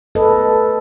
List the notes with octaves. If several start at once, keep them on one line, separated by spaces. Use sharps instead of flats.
A4 B4 D#5